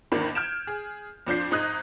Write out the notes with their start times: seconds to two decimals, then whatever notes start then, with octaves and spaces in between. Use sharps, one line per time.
0.12 G#1 E2 D#3 A#3 D4 B5
0.35 F6 G6 G#6 D7 E7
0.67 G#4
1.27 F2 F3 D4 G6 C7
1.51 G#1 D#4 D#6 F#6 G#6 D#7